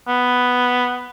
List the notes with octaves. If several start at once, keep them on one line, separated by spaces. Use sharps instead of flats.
B3